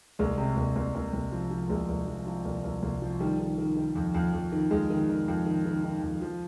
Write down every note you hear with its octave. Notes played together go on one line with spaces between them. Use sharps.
C2 G#3
C3
C2
C2
C2
C2
F3
F3
C2 G#3
C2
F3
F3
C2
C2
C2
F3
D#3 G3
D#3
D#3
D#3
F2
F2
F2
D#3
F2 G#3
D#3
D#3
F2
D#3
D#3
D#3
F2
F3